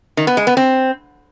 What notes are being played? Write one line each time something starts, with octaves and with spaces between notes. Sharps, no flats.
D#3
B3
G#3
B3
C4